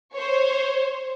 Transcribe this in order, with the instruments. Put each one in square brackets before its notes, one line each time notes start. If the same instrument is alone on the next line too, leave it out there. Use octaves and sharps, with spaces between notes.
[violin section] C5 C#5